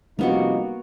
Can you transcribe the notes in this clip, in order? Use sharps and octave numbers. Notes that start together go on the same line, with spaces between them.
C3 F3 G3 A#3 B3 C#4 D#4 F#4